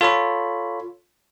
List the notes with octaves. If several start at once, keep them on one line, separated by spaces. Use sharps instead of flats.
F4 A4 C#5 B5